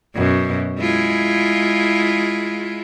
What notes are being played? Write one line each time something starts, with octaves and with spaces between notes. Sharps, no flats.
F#2 B2
G#3 E4 F4